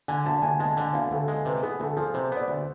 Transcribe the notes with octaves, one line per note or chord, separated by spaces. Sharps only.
D3 G#5
D2 A5
D2 G#5
G#3 A5
D3 G#5
D2 F5
D2 A4
G#3
C3 B4
B3 G#4
D2 A4
F3 G#4
C3 C5
B3 D5
D2